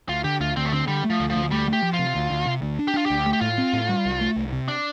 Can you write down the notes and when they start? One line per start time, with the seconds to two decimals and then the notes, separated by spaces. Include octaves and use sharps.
0.09 D2 F4
0.24 D3 G4
0.40 D2 F4
0.56 D2 C4
0.65 A3
0.72 D3 C4
0.88 D3 G3
1.04 A3
1.10 F3
1.20 D2
1.30 F3
1.36 D2
1.51 G3 A3
1.68 A3 G4
1.83 F3
1.94 F4
1.99 C3
2.15 D2
2.31 D2
2.47 C3
2.62 D2
2.79 D4
2.88 G4
2.94 D4 F4
3.06 D2 G4
3.26 A3
3.33 G4
3.41 A2 F4
3.58 C4
3.73 A2
3.89 G3
4.05 C2
4.21 A3
4.36 C2
4.52 C3
4.68 D4